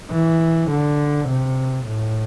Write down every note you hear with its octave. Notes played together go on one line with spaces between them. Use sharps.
E3
D3
C3
A2